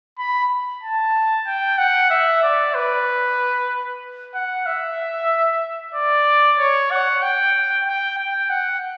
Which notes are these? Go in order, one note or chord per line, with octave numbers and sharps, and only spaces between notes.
B5
A5
G5
F#5
E5
D5
B4
F#5
E5
D5
C#5
F#5
G5
G5
G5
F#5